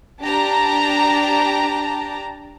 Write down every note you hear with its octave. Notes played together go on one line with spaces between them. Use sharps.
D4 G4 A5 A#5